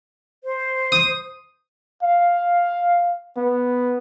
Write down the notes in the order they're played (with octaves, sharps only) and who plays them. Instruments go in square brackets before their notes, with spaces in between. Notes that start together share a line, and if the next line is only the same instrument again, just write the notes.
[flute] C5
[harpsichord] D#6
[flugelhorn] F5
B3